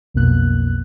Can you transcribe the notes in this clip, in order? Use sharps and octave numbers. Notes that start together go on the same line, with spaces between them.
B1 F2 B2 A#3 F#6